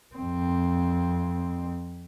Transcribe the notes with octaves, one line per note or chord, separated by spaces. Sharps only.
F2 C4